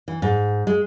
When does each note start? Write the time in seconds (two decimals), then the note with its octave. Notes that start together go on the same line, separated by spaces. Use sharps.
0.08 E3
0.22 G#2
0.67 G#3